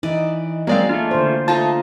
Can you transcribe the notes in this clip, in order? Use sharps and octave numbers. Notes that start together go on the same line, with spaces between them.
E3 D#4 D5
F#3 G#3 A#3 C4 G#4 D5 F5
A3 D4 F4
D3 C5
A3 D#4 F4 D#5 A5 A#5